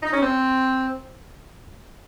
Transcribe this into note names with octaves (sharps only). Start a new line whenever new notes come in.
D#4
C#4
C4